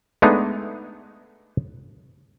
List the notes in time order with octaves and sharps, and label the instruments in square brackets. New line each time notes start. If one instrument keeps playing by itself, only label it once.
[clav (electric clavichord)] G#3 A3 B3 D4 D#4